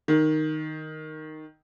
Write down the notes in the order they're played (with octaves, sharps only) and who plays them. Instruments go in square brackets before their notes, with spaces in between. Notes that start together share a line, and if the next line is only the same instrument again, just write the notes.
[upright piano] D#3